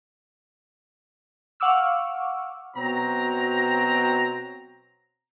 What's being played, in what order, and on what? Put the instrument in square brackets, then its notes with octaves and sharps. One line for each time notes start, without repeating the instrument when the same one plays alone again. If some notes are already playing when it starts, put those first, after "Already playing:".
[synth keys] F5 F#5 C#6 D6 E6 F6
[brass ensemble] B2 F#3 C4 A#5